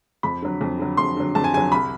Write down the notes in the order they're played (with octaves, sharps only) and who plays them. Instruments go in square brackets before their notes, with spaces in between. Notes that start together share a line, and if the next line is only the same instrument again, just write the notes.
[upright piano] F2 B5
D3 F#3
F2
D3 F#3
F2 C6
D3 F#3
F2 A5
G#5
D3 F#3 G#5
C2 B5